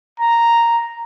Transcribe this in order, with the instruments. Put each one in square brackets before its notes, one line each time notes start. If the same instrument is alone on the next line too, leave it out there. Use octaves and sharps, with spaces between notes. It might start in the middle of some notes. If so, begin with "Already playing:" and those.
[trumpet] A#5